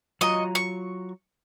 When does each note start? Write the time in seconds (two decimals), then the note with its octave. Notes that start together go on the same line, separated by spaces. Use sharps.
0.21 F#3 F4 D#5 A#5 C#6
0.55 C#6